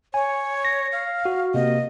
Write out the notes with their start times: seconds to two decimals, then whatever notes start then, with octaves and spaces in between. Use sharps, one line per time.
0.14 C#5 G#5
0.65 A#6
0.92 F5
1.25 F#4
1.54 C3 A#3 D#5